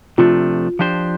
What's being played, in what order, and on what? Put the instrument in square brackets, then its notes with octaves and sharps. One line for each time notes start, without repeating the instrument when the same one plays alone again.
[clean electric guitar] C3 F3 A3 D4 [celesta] F4
[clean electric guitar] F3 D4 G4 C5